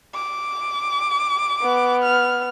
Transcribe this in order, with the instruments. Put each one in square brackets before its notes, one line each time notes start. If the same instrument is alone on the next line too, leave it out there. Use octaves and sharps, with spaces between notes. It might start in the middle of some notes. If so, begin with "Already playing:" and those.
[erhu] D6
[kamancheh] B3
[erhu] F6